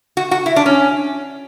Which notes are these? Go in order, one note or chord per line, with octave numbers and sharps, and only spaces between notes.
F#4
F#4
E4
D4
C#4